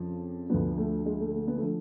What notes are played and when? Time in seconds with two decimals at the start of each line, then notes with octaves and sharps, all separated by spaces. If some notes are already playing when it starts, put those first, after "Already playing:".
Already playing: F2 C#3 F3
0.50 D2 D3 F3 B3
0.78 A3
1.06 G#3
1.20 A3
1.33 A3
1.47 B3
1.58 D3 F3 A3